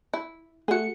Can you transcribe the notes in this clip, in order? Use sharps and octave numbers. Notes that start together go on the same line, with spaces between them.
E4
A3 F#4 G#4 C#7